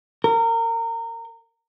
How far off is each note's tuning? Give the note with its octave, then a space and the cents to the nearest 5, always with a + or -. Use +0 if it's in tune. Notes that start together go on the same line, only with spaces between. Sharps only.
A#4 -25